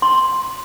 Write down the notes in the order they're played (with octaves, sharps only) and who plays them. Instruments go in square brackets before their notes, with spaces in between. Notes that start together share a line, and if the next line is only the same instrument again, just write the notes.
[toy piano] C6